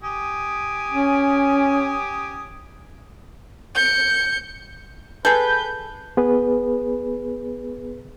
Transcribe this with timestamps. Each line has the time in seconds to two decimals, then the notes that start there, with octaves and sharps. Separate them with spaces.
0.03 G4 G#5 D#6
0.92 C#4
3.75 G6 C#7
5.25 G#4 A4 B4 G6
6.17 B3 G#4 B4